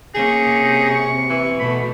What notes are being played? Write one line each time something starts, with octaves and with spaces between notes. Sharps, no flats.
A#3 C#4 D#4 G#4
C3
C#6
E3
B2 A3 B5